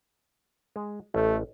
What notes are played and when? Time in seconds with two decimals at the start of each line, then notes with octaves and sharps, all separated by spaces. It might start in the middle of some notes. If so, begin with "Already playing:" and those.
0.76 G#3
1.14 A1 A3